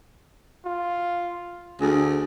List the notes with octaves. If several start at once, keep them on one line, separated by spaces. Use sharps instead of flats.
F4
D2 G#4